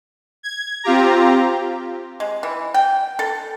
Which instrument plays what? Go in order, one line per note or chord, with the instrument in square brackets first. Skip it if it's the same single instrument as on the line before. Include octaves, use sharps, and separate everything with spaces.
[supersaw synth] G#6
C4 F4 G4 A#5
[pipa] G#3
E3
G5
A4